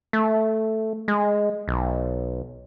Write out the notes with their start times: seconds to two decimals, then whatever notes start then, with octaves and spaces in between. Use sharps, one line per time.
0.13 A3
1.08 G#3
1.68 B1